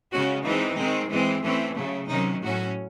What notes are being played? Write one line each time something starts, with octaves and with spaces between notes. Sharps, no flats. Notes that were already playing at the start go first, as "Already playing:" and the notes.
C#3 G#3 C#4 F#4
E3 G#3 C4 D#4
D#3 G#3 C4
E3 G#3 C4
E3 A3 C4 C#4
C#3 F#3 A3
C3 D#3 F#3 C#4 D#4
A2 F#3 C#4 F#4